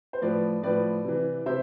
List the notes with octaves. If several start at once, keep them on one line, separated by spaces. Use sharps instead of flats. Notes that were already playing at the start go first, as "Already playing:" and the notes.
C5
A2 F3 B4 D5
A2 F3 B4 D5
C3 E3
C3 C5 E5